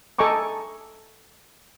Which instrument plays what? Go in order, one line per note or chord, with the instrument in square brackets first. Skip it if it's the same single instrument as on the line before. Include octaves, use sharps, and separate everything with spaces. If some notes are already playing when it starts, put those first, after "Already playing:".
[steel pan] A4 D#5 G#5 A#5 C#6 D6